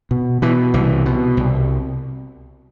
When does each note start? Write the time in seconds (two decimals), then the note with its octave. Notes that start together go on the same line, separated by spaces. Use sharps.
0.11 B2
0.42 B2 E3
0.74 C2 E3
1.06 B2
1.37 C2